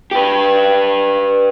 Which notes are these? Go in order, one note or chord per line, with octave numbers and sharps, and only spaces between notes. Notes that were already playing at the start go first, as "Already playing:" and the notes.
G4 B4